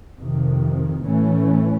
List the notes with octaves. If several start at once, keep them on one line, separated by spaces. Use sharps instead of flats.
F2 C3 D#3
A2 E3 A3 C#4